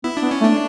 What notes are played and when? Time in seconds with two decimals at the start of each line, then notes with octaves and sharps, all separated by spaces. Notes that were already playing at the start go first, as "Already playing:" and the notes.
0.04 B3 E4
0.17 D4
0.22 B3
0.31 C#4
0.41 A3
0.44 D4